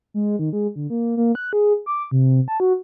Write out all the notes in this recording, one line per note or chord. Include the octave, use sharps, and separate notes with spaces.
G#3
D#3
G#3
D3
A#3
A#3
F#6
G#4
D6
C3
A5
F#4